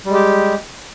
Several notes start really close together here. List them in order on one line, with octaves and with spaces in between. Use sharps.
G3 G#3 G4